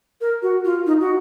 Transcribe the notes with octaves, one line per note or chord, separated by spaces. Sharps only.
A#4
F#4
F4
D#4
F#4